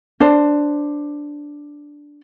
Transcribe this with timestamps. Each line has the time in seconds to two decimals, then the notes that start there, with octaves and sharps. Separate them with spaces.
0.20 D4 C5